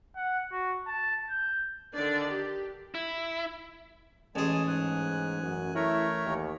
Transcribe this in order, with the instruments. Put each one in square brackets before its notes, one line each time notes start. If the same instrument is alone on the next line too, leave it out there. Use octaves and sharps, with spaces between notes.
[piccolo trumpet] F#5
F#4
A5
G6
[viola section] D3 D#3 D4 D5
G4
[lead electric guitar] E4
[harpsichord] A1 G#4 [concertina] G#3 G#5 A5
[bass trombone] G#2 [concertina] G#5 F#6
[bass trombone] F#2
[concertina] A3 A#4 C#5 [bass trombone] E4
[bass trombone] D#2